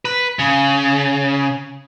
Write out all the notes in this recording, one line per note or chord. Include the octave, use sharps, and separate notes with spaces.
B4
C#3